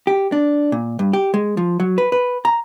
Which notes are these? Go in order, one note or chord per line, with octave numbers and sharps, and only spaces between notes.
G4
D4
A#2
G2
G4
G#3
F3
F#3
B4
B4
A#5